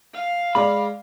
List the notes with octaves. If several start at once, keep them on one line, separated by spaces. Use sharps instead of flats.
F5
G#3 D5 B5